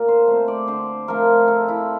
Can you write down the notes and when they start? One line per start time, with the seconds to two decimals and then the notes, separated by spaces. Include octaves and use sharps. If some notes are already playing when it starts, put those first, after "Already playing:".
Already playing: A#2 A#4
0.08 C5
0.28 A3 C4
0.48 D5
0.68 D3 C5
1.08 F3 A3 C4 A#4
1.48 C3 A4
1.68 E4